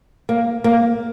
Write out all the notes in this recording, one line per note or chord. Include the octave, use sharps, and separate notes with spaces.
A#3
A#3